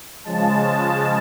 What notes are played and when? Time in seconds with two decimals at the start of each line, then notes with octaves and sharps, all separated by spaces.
0.24 C#3 F3 G#3 A5